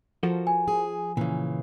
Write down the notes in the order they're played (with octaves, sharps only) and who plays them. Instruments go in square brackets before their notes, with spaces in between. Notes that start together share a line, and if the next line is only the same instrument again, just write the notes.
[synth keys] F3 [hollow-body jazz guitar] F#4 A4 A#4
[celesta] G#5
[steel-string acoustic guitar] G#4
[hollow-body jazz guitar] A#2 C#3 [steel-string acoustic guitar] E3